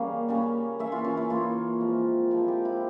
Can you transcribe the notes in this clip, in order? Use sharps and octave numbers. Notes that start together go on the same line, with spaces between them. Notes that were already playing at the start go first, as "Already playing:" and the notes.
Already playing: C#3 G3 A#3 C#4 F5
C#3 G3 A#3 C#4
E3 A#3 C#4 E5
F4
C#4
E4
E3 A#3 C#4 F4
C3 F3 G#3 C4
C3 F3 G#3 C4 E4
G4
E4